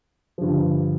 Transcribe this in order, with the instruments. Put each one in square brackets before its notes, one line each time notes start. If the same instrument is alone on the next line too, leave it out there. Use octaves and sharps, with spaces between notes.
[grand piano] G2 D3 F3